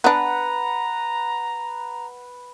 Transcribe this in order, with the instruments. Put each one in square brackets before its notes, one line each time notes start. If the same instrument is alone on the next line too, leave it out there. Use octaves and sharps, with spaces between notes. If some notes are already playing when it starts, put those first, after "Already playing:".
[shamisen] B3 D4 [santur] B4 F#5 [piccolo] A#5